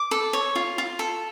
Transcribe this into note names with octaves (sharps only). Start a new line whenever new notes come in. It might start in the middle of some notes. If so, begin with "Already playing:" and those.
Already playing: D6
A4
C#5
F4
F4
A4